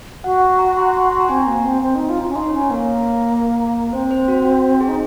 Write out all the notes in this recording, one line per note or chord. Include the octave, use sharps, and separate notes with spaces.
F#4 F#5
F#5
A#5
C6
C6
C6
A#5
C4 G#5
A#5
A#3
C4
C4
D#4
F4
F4
C#4
D#4 C6
C#5
C#4
C#5
A#3 A#4
C4 C5
C5
F#4
F#4
G#4
D#4